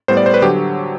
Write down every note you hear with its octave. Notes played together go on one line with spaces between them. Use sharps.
A2 G3 B3 C5
D5
C5
B4
D3 F#3 G4